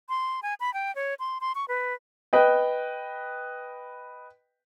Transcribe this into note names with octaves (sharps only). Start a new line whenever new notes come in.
C6
G#5
B5
G5
C#5
C6
C6
C#6
B4
B4 D#5 G5